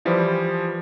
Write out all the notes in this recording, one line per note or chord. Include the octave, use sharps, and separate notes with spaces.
E3 F3 G3